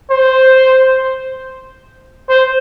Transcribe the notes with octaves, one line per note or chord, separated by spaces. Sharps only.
C5
C5